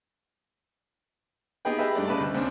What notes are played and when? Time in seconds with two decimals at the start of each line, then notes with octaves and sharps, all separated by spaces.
1.65 B3 D#4 G4 G#4 B4 G5
1.78 G4 G#4 B4 D#5 E5 B5
1.95 G2 A3 D5
2.08 C#3 G#3 B4 D5 D#5 A5
2.20 D2
2.34 C#2 C4 D4